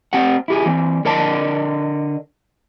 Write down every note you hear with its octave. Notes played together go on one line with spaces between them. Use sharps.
C4 G4 F#5
E4 G4 G#4
E3 C4
D3 A#4 D5 D#5 A5